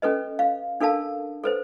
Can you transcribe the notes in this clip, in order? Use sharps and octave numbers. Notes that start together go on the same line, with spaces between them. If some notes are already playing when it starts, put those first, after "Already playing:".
C#4 A4 B4 D#5
F5
D4 A4 A#4 F5 A5
A4 B4 C5